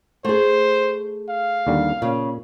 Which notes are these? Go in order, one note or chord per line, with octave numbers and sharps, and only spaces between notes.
A3 G#4 C5
F5
D#2 D3 G3
A#2 C#3